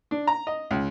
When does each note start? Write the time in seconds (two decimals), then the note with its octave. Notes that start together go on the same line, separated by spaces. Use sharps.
0.11 D4
0.27 A#5
0.47 D#5
0.71 C#2